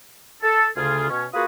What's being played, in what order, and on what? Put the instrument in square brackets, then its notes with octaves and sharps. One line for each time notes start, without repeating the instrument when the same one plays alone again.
[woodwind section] A4
D2 C#3 F4 G#4
B2 C#4
A#3 F4 F#4 G#4 B4 D#6